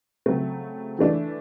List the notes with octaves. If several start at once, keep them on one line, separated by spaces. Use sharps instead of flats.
C#3 F#3 A3 C4
E3 A3 D4